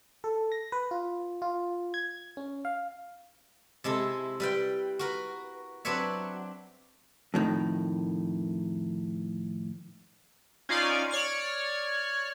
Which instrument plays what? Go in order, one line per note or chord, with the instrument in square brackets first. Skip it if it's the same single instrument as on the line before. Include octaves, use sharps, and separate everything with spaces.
[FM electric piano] A4
A#6
B4
F4
F4
G#6
C#4
F5
[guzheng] C3 G#3 E4 A4
G3 B4 G5
F#4 A#4 B4
F#3 C4 D4 B4 C#5 E5
[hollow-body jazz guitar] F2 A2 D#3
[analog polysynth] C#4 D#4 F4 D5 F5 G#5
C#5 D5 F6